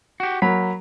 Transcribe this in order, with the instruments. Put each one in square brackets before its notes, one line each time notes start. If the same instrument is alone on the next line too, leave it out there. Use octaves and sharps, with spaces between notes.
[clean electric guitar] F#4 G4
[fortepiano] F#3 A#3 [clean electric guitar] B5